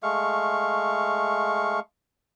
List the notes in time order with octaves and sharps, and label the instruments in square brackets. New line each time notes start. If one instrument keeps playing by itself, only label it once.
[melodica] G#3 A3 F5 C#6